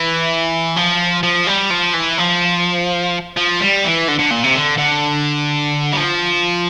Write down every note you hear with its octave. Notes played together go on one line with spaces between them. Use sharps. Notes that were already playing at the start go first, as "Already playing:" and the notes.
Already playing: E3
F3
F3
G3
F3
E3
F3
F3
G3
E3
D3
D3
A#2
C3
D3
D3
G3
F3